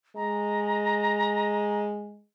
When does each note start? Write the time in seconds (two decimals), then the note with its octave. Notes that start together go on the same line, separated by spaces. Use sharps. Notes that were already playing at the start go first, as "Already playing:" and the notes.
0.16 G#3 A#5